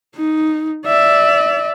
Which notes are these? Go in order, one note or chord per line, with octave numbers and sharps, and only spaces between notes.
D#4
D5 E5